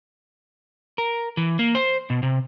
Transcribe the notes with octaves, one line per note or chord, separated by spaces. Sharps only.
A#4
E3
A#3
C5
B2
C3